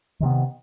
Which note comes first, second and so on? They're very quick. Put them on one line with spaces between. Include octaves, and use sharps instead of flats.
D#3 C3 B3